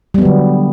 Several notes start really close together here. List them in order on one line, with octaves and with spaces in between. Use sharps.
G3 B3 F#3 D3